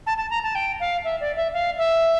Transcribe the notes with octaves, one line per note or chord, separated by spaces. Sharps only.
A5
A5
A#5
A5
G5
F5
E5
D5
E5
F5
E5